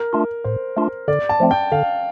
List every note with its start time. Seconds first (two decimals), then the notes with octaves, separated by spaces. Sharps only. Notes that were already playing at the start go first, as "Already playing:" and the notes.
Already playing: A#4
0.13 A3 D4 F4
0.44 A2 C5
0.77 A3 D4 F4
1.08 D3 D5
1.29 A5
1.40 F3 A3 C4
1.51 G5
1.72 D3 F5